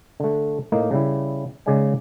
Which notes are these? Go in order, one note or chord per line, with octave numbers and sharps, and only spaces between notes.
D3 A3
A2 A#3 D#4
C#3 G3 E4
C#3 G#3 D#4 D5 G#5